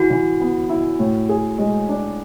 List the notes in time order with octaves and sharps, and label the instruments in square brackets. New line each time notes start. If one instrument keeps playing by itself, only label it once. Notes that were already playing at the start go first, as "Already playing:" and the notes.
Already playing: [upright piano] E3 [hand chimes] F#4
[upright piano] E3
B3
E4
A2
G#4
G#3
D4